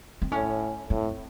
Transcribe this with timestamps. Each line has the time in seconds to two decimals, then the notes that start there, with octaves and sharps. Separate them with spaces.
0.22 C4
0.31 A2 C#4
0.90 A2 C4